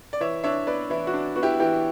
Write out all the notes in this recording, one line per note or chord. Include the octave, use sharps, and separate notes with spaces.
D5
E3 C#5 E5
D4 C#5 E5
B3 B4 D5
E3 E4
F#4
D4
B3 F#4
E4 G4
E3 E4 G4